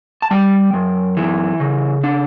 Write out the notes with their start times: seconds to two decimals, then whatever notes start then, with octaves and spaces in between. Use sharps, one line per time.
0.22 A5
0.31 G3 G5
0.73 F#2
1.17 E3
1.60 C#3
2.04 D4